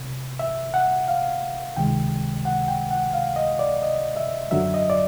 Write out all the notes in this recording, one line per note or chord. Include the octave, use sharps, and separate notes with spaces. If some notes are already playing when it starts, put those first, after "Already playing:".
Already playing: C3
E5
F#5
F5
C#2 C3 D#3 G#3 G5
F#5
G5
F#5
F5
D#5
D5
D#5
E5
F#2 D3 F#3 E5
D#5
D5